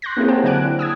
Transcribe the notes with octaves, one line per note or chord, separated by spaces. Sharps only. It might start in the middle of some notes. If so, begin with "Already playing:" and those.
C6 F#6 G6 A#6
A#3 C4 E4 G4 G#4 C#5
C5 F#5 G5 A5
D3 F#3 D5 G#5 F#6 D7
E4
D#6 E6 G#6